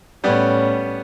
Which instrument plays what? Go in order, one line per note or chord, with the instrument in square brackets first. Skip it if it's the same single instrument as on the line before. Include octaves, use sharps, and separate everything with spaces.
[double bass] A2 C#4 [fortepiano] G3 B3